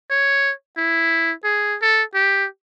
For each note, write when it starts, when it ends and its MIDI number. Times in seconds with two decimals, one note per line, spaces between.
0.10 0.51 73
0.77 1.32 64
1.44 1.76 68
1.82 2.03 69
2.15 2.46 67